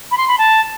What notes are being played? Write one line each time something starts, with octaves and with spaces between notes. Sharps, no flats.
B5
C6
B5
A5